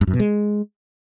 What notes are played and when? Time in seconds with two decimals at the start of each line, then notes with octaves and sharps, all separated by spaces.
0.01 G2
0.07 F#2
0.13 B2
0.20 G#3